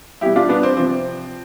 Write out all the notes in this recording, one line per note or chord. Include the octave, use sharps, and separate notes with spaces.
B2 G3 E4 G4
D4 F4
B3 D4
C4
C3 F3 C4